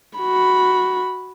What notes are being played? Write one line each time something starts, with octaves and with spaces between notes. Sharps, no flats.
F#4 B5